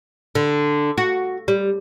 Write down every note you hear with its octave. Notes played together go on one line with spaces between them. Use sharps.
D3
F#4
G3